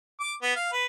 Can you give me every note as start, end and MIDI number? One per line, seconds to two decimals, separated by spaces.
0.20 0.33 86
0.42 0.52 59
0.56 0.69 77
0.72 0.85 71